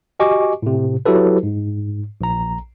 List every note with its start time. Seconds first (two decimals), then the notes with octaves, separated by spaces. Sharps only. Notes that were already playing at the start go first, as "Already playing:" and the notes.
0.20 F#4 G4 D#5 G#5 C#6 D6
0.62 A2 C3
1.06 F#3 E4 F#4 G4 A4 B4
1.43 G#2
2.21 A#1 A#5